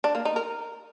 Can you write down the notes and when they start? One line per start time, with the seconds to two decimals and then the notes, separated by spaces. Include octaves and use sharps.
0.04 D4
0.15 A#3
0.25 D#4
0.36 A#4